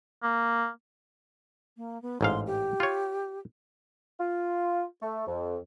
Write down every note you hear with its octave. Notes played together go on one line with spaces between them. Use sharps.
A#3
A#3
B3
A1 G#2 F5 C6
G4
F4 C#5
F4
A3
F2